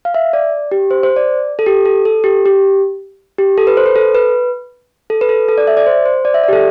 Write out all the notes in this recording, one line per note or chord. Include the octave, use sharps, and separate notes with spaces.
F5
E5
D5
G4
C5
C5
D5
A4
G4
A4
A4
G4
G4
G4
A4
B4
C5
B4
A4
B4
A4
B4
A4
A4
D5
E5
D5
C5
C5
D5
E5
D5
G4
A4